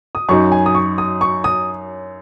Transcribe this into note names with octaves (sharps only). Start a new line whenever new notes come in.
D#6
F#2 F#3 D#4 C#6
G#5
D#6
C#6
D#6
C#6
D#6